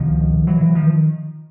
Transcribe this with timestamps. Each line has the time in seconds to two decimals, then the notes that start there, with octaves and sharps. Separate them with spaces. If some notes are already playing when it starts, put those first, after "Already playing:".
Already playing: C#2 B2 D#3 F3
0.47 E3 F#3
0.61 E3 F#3
0.75 D#3 F3